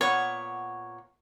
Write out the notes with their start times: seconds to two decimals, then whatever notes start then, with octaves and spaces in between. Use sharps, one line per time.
0.01 A#2 B3 C#5 F#5